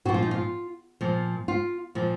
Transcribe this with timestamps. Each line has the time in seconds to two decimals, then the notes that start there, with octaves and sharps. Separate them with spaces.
0.05 A#2 F3 F#4
0.14 F4
0.23 D#4
0.31 F4
1.01 A#2 F3
1.48 F4
1.95 A#2 F3